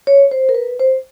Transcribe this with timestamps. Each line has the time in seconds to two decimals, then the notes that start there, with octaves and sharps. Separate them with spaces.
0.07 C#5
0.31 C5
0.49 A#4
0.55 B4
0.79 C5